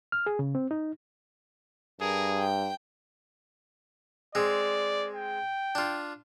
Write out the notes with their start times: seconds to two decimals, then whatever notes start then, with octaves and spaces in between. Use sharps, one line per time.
0.12 F6
0.26 G#4
0.39 C#3
0.55 C4
0.71 D#4
2.01 G2 G#4 A#4
2.39 G5
4.35 G#3 C4 D5
5.15 G5
5.75 D4 F4